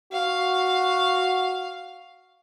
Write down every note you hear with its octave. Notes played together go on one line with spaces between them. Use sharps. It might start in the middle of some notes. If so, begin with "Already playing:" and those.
F#4 F5